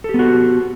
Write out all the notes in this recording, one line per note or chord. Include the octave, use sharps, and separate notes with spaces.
B3 F#4 G4 A4